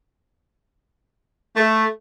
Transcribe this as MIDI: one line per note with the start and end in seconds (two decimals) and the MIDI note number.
1.56 1.85 57